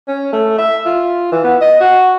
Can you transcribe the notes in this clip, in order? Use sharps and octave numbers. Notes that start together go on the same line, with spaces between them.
C#4
A3
E5
F4
E3
B3
D#5
F#4